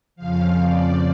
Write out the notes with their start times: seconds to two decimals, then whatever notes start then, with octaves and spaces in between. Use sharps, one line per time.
0.16 F2 C#3 F3 F5
0.62 D5